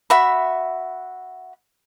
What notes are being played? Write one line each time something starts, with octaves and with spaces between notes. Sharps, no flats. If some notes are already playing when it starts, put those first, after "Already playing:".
F#4 E5 B5